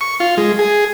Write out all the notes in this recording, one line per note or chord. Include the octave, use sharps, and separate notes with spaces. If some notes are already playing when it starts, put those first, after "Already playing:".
C#6
F4
G#3
G#4